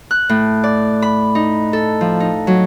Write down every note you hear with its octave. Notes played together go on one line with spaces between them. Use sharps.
F#6
A2
D5
B5
D#4
A4
F3
D#4
F#3